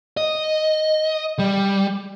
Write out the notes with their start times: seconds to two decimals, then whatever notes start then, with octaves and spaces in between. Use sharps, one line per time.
0.17 D#5
1.39 G3